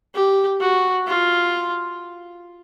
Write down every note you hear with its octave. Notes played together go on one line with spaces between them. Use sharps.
G4
F#4
F4